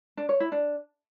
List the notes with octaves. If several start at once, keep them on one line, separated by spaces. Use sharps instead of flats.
D4
C#5
E4
D4